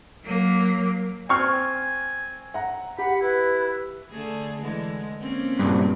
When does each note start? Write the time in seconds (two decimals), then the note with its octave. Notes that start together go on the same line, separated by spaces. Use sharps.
0.25 F#3 A#3
1.29 C4 G#5 C#6 F6
2.54 F#5 A#5
2.98 G4 F#5 B5
3.21 E4 B4
4.11 D3 A3 G#4
4.60 D3 E3 G#3
5.18 A#3 C4 C#4
5.59 G2 A#2